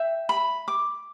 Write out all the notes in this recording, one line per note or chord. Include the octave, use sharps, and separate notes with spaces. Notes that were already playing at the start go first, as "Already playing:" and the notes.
Already playing: E5 G5
B5
D6